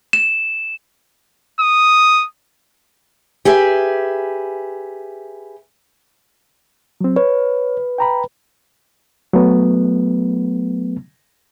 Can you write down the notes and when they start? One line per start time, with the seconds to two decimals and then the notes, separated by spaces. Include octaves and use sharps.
0.13 E7
1.60 D#6
3.45 G4 G#4 B4 E5
7.01 F#3 C4
7.16 B4 C#5
7.98 G5 A#5 B5
9.33 F#3 A3 B3